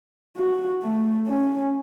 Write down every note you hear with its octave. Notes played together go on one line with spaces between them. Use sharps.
F#4
A3
C#4